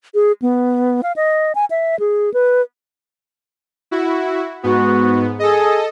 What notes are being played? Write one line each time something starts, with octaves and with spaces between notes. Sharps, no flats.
G#4
B3
F5
D#5
G#5
E5
G#4
B4
E4 F#4
G#2 B3 F#4
G#4 A4 D#5